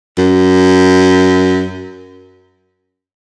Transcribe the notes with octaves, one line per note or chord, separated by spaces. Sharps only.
F#2